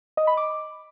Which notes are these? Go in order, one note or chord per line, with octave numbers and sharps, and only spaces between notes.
D#5
B5
D6